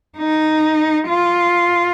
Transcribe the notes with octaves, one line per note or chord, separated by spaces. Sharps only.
D#4
F4